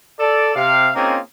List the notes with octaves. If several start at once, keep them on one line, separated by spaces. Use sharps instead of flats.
A4 D5
C3 F5
A#3 C4 C#4 D#4 F4 G#4